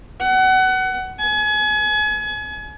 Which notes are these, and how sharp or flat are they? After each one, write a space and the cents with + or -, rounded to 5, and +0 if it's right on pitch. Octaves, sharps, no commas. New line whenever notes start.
F#5 +25
G#5 +35